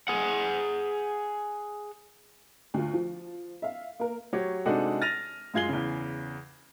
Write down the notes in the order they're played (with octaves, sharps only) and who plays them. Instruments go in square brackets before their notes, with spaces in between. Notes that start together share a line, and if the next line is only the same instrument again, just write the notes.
[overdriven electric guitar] G#4 F#5
[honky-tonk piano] D2 F4
F3
E5 F5
A#3 A#4
[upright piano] F#3 G4 C#5
C3 G#3 D4 D#4 F#4 A4
F6 A6 A#6 D#7 F7
F#2 G#3 F4 G#6 C7 G7
E2 C#3